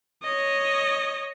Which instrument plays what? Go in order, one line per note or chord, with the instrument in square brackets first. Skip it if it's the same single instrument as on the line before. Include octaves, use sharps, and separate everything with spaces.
[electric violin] C#5 D#5